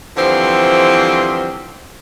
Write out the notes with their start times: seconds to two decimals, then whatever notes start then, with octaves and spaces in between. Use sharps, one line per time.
0.16 D3 E3 F3 G3 C4